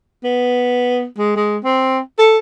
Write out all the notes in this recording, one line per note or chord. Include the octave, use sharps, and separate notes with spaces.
B3
G#3
G#3
C4
A4